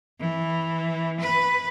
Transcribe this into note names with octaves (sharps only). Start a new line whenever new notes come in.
E3
B4